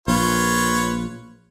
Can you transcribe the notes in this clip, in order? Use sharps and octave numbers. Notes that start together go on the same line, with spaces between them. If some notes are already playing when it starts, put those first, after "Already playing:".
A#1 F4 B4 C#5